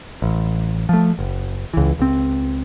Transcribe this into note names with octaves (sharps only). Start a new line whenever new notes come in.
A1
F3 A3
F#1
C#2 E3
C#2 C4